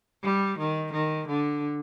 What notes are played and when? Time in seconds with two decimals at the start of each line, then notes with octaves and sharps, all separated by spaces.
0.23 G3
0.59 D#3
0.93 D#3
1.28 D3